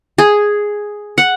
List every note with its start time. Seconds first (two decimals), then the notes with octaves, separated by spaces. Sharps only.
0.18 G#4
1.18 F#5